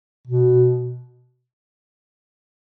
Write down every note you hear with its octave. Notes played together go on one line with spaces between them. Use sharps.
B2